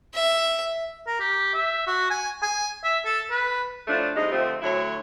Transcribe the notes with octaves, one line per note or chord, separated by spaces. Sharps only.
E5
A#4
G4
E5
F#4
G#5
G#5
E5
A4
B4
A2 F3 A3 D4
G2 C3 G#3 D#4 D#5
D3 F3 A3 C4
D2 F#3 E4 C#5